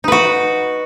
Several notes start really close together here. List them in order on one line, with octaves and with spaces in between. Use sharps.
D#4 B4 F#4